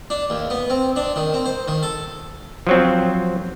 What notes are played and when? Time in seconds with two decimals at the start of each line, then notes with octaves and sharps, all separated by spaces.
0.10 D4
0.30 D#2
0.50 B3
0.70 C4
0.96 D4
1.16 D#3
1.34 C4
1.46 C5
1.68 D#3
1.83 A4
2.67 F3 F#3 C4